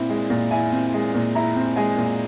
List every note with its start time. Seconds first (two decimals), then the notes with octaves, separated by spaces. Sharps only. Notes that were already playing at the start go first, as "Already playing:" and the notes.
Already playing: A#2 C4 E4
0.10 G#3
0.30 A#2
0.51 E4 G#5
0.72 C4
0.94 G#3
1.15 A#2
1.35 E4 A#5
1.56 C4
1.76 G#3 G#5
1.98 A#2